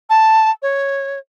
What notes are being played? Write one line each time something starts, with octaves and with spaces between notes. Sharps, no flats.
A5
C#5